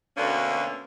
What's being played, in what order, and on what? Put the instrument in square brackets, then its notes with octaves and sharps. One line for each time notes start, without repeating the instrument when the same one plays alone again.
[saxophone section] D2 B2 D3 A#3 C#4